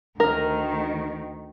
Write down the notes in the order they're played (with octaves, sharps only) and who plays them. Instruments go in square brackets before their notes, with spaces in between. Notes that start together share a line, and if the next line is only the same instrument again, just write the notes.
[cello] D2 D#3 [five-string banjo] A#4